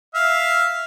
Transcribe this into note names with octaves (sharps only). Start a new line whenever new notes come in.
E5 F5